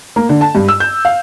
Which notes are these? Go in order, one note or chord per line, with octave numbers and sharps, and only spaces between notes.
A#3
D3
A5
G2
E6
G6
F5